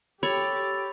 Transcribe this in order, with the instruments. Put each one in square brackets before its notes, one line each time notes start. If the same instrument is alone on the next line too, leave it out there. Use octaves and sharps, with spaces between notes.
[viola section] G4 [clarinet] A4 [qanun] C#5 [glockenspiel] B5 F7